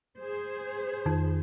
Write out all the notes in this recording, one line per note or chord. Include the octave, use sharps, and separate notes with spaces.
G#4 C5
F2 D#3